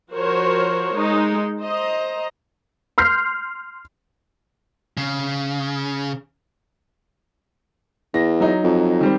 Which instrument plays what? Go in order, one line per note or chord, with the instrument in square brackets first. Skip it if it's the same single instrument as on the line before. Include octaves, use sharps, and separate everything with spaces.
[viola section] F3 F#4 A#4 C5 C#5
G#3 D#4
C5 D#5 A#5
[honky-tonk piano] C6 F6 G6 C7
[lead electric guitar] C#3
[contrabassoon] E2 [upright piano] A#6
[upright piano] F#3 D#4
[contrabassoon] F2
[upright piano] D#3 G3 C4